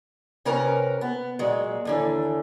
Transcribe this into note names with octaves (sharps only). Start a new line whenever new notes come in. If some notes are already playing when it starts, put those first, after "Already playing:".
C3 C#4 A#4 B4 A#5
B3
A#2 F#3 G#3
D#2 D3 E3